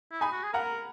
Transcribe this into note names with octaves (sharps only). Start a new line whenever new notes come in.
E4
D#4 G#5 B5
F#4
G#4
A#4 F#5 A#5